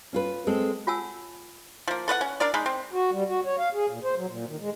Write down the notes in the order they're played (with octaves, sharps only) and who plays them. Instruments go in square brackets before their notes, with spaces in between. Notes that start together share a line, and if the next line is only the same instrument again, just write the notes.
[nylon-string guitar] C#4 F4 B4
G#3 C4 A4
[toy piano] F4 C#5 F#5 G#5 A5 E6
[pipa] F3 A#3
A4 B4 D5 F#5
C#4
D4 A#4 D5
G#3 D#4 B5
C4
[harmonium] F#4
G3
F#4
C#5
F5
G#4
A#2
C5
F#3
A#2
D#3
G#3